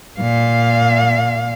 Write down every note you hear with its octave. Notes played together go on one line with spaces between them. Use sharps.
A#2 F5